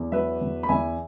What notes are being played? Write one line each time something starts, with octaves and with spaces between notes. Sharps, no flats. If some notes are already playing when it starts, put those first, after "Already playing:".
Already playing: E2
F#3 B4 E5
E2
B5
E2 E5 G#5